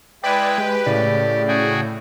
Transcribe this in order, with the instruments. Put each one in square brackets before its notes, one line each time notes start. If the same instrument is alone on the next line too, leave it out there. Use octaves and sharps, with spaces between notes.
[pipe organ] G#3 E4 [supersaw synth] B4 [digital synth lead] D5 [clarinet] G5
[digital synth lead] G#3 [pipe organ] G4
[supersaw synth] A2 [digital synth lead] C#3 [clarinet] D5
[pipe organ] F#4 G#4 G5